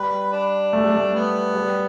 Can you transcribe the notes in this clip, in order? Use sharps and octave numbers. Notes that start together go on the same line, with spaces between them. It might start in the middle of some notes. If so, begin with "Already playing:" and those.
Already playing: G3 B4
D4
A3
G3
A3
B3
G3